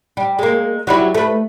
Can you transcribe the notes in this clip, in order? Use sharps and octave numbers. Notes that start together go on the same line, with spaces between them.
G3
G#3 A#3
F#3 G3 E4
A3 B4